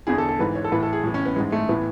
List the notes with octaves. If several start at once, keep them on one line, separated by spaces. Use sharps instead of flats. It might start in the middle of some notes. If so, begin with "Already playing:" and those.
E2 D3 G#4
A4
A4
G#2 E3 B4
C#5
A4
A2 E3 B4
A4
G#4
A2 E3
C#4
B3
G#2 E3 G#3
A3
A2 E3 B3